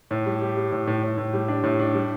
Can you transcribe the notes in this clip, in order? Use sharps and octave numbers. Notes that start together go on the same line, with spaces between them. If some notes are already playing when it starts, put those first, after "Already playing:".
A2
G3
G3
G3
A2
A2
A2
A2
G3
D4
A2
D4
G3